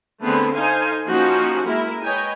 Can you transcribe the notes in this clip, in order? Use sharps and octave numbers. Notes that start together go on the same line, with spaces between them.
D3 A3 B3 C4 G#4 B4
D#4 A4 C5 F5 G#5
F3 A#3 C#4 D#4 F#4 G4
G#3 A#3 E4 A#4
B4 C#5 D#5 G5 G#5